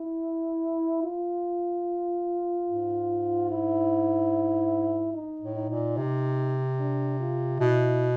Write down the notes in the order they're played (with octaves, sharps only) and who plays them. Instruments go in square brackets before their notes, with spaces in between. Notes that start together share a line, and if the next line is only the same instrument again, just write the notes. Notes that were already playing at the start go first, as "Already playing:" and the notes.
Already playing: [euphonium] E4
F4
[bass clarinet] G#2
[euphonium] E4
D#4
[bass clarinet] A2
[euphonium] D#4
[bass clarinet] A#2
C3
[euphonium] D4
F4
[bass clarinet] B2 [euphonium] E4